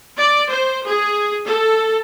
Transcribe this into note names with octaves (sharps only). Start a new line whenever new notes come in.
D5
C5
G#4
A4